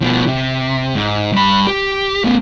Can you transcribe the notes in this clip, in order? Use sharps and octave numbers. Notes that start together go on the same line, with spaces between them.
B2 F3
C3
G#2
G2 B5
G4
A3 B3